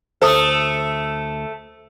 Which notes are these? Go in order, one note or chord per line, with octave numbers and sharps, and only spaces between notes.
D2 A3 A4 C5 D#6